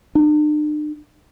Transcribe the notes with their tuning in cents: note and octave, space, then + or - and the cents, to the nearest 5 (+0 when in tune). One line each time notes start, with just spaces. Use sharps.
D4 +45